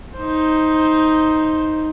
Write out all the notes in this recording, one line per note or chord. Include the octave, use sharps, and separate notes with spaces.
D#4 C5